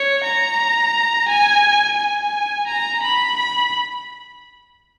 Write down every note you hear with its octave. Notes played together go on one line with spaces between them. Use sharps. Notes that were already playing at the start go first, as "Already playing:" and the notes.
Already playing: C#5
A#5
G#5
G#5
A#5
B5
B5